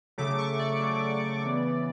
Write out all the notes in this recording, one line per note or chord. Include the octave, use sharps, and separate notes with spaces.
C#3 F#3 A3 D6
C#6
D5
C#3 F#3 A3
C#3 E3 B3